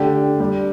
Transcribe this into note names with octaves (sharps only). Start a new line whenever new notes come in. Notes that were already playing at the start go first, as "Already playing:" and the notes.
Already playing: D3 A3 D4 G4
G3 D4 G4